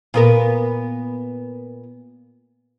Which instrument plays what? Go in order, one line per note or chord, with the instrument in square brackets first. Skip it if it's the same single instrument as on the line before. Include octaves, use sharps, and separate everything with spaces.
[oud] A#2 B3 A#4